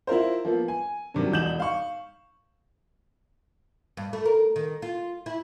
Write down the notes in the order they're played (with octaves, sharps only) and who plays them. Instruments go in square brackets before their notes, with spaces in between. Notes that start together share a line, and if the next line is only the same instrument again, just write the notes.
[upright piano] E4 F4 A#4 C5
F3 A#3 B3
G#5
G2 C3 D#3 F#3
E1 E2 D#4 G6 E7 F#7
F5 C#6
[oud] G2
A3
A#4
D#3
F4
E4